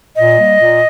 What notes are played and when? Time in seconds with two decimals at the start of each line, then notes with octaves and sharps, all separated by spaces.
0.15 A#2 D#5
0.37 G3 A#3
0.58 A#2